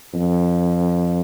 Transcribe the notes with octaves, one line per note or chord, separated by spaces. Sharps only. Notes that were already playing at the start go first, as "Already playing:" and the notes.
F2